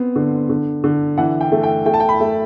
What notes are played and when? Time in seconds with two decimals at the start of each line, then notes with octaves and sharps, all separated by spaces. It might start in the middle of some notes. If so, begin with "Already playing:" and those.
Already playing: B3 C4
0.16 D3
0.49 D3
0.84 D3
1.18 E3 F#5
1.41 G5
1.52 A3
1.63 G5
1.86 A3 G5
1.94 A5
2.00 G5
2.09 B5
2.20 A3